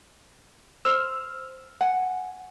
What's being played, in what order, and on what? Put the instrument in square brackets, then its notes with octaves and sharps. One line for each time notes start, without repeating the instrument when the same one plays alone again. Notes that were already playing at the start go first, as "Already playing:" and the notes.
[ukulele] C5 [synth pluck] E6 F6
[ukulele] F#5 G#5